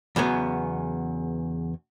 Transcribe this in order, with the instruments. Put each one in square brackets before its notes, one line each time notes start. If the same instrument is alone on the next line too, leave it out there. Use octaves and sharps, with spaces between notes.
[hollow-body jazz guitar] E2 C#3 F#3 B3